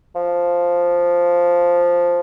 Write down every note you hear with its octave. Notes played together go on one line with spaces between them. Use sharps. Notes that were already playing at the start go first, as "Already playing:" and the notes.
F3